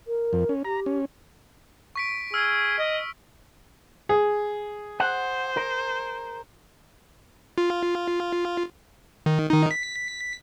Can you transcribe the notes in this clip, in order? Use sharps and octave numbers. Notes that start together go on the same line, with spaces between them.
A#4
F2
C#4
G4 A#5
C#4
C#6 B6 D7
G#4 E6 F6
D#5
G#4
C5 F#5
A#4
F4
D#3
D#3 D#4
B6